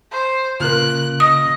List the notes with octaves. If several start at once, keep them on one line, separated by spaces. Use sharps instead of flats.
C5
A#2 C#3 A#4 F#6
D#5 D#6